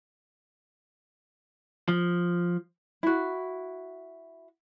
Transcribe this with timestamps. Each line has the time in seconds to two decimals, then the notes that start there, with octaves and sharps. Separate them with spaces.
1.88 F3
3.03 E4 F#4